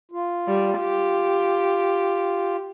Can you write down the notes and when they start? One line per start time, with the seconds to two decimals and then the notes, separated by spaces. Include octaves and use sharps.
0.11 F4
0.48 G3
0.79 G4